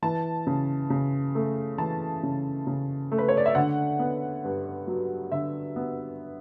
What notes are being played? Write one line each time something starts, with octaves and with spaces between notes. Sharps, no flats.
E3 A5
C#3
C#3
A3
E3 A5
C#3
C#3
A3
B4
C#5
D5
E5
D3 F#5
B3
G2
F#3
D3 E5
B3